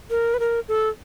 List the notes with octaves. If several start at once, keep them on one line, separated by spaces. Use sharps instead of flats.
A#4
B4
A#4
A4